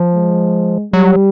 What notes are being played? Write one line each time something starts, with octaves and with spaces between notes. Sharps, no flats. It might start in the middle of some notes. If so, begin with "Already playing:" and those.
Already playing: F3
G#3
F#3 G3